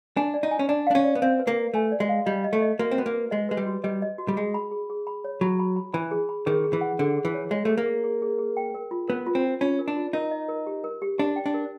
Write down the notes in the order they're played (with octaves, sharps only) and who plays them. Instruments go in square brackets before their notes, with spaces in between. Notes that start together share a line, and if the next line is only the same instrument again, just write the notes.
[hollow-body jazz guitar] D4 [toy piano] G#5
[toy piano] D5
[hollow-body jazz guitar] D#4
[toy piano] G#5
[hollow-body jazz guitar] C#4
[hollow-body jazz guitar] D4 [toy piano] D5
[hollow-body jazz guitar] D4 [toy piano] F5
[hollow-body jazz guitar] C#4
[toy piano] D5
[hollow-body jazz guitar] B3
[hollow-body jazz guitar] C4 [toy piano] F5
[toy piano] B4
[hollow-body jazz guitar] A#3
[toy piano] B4
[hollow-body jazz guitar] A3 [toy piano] G#5
[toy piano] D5
[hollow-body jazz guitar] G#3
[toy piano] F5
[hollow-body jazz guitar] G3 [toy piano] D#5
[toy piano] D#5
[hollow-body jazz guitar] A3
[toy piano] D#5
[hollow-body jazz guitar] A#3 [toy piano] F#4
[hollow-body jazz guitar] C4
[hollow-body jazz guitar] B3 [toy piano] F#4
[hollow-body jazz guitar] A#3
[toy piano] B4
[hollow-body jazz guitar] G#3 [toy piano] D#5
[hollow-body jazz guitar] G#3 [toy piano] B4
[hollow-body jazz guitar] G3
[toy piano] F#4
[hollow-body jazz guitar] G3 [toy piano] D#5
[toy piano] D#5
F#4
[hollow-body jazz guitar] G3
[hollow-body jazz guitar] G#3 [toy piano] G#4
[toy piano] B5
G#4
G#4
B5
C#5
[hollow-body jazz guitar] F#3 [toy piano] B5
[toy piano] B5
B5
[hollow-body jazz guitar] E3 [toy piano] B5
[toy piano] G#4
B5
[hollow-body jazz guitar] D#3 [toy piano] G#4
[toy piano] G#4
[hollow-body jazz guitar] E3
[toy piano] F#5
[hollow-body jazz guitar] D3 [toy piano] G#4
[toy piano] G#4
[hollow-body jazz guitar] E3
[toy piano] C#5
[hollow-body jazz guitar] G#3 [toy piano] C#5
[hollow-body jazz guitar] A3 [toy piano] G#4
[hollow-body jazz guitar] A#3
[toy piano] G#4
G#4
G#4
G#4
G5
A#4
F4
[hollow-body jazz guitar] B3 [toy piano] A#4
[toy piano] F4
[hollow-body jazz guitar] C4
[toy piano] F4
[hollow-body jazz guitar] C#4 [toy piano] F4
[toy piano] A#4
[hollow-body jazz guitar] D4
[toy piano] F4
[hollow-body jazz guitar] D#4 [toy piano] A#4
[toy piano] D#5
A#4
G4
A#4
G4
[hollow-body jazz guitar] D4 [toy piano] G4
[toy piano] G5
[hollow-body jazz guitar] D4
[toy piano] A#4